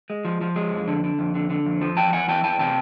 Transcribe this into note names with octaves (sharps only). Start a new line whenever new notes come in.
G#3
F3
F3
G#3
F2
D3
D3
F2
D3
D3
F2
F3
E2 G5 A5
E2 F#5 G#5
E3 G5 A5
E2 G5 A5
C3 G5 A5